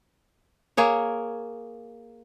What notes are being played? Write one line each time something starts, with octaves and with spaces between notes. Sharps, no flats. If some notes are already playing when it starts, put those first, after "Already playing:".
A#3 G#4 C#5